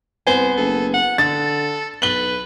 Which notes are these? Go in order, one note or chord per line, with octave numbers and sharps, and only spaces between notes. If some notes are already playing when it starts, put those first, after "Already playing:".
C2 B3 C5 G#5
F#1 A4
F#5
D3 A4 A6
B1 B4 F#7 G7